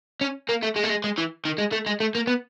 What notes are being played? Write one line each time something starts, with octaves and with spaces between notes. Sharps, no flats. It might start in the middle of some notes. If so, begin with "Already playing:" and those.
C#4
A#3
A3
G#3
A3
G#3
G#3
E3
D#3
G#3
A3
G#3
A3
A#3
B3